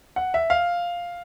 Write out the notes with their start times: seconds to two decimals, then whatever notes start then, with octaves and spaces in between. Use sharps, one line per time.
0.16 F#5
0.34 E5
0.50 F5